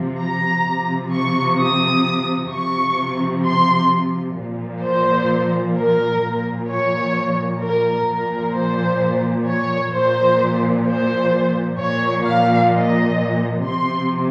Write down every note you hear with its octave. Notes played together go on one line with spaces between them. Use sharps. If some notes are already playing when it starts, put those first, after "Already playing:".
Already playing: C3 F3
A#5
C3 F3
C#6
D#6
C3 F3 C#6
C6
A#2 F3
C5
A#4
A#2 F3
C#5
A#4
A#2 F3 A#4
C5
C#5
A#2 F3 C5
C5
A#2 F3 C#5
F5
D#5
C3 F3 C6